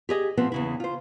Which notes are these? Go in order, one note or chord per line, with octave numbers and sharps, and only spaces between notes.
G4 G#4 D#5
A2 F3 B3 C4
E2 C#3 E4
F4 C5